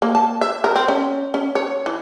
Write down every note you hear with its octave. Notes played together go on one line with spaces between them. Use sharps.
A#3
A5
E5
A#4
C4
C#4
C#4
C#5
E3